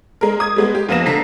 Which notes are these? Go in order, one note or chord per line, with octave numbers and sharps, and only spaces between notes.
G#3 A#4
D#6 G#6
G3 G#3 B3
G4
F2 F3 A#3 B3 A#6 E7
D3 A4 A#5 B6 C7